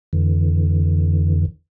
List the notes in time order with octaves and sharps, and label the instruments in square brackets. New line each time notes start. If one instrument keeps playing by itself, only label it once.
[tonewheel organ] F2 D3 E3